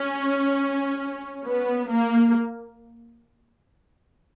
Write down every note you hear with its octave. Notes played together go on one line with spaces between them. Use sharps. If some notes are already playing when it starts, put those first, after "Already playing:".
Already playing: C#4
B3
A#3